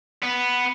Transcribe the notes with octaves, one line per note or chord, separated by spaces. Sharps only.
B3